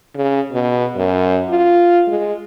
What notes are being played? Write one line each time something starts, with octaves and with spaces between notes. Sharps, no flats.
C#3
B2
F#2
F4
G#3